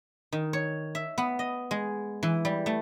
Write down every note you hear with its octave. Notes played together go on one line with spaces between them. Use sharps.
D#3
C#5
E5
B3
D#5
G#3
E3
G3
A3